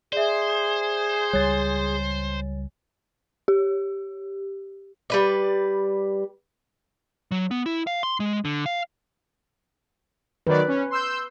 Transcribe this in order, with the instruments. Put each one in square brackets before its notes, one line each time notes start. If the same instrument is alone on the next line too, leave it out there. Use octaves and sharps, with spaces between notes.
[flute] G#4 [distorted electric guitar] C5 [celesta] D5 E5
[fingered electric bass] C#2 G3 [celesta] C#5 G#5 A6
[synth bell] G4
[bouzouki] G3 B4 D5
[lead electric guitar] F#3
B3
E4
F5
C6
G#3
D3
F5
[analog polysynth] D#3 F#3 D5 [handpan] B4
[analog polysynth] C#4
C6 E6 G6